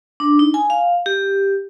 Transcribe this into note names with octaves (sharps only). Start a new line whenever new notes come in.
D4
D#4
G#5
F5
G4